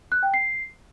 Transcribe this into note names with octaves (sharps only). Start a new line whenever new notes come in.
F#6
G5
C7